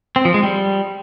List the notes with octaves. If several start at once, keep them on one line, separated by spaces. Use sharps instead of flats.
C4
F3
G#3
G3